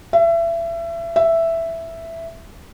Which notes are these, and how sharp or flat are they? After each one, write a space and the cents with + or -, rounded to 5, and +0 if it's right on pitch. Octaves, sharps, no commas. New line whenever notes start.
E5 +30
E5 +5